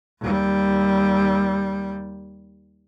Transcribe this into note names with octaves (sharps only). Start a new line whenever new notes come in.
D#2 G3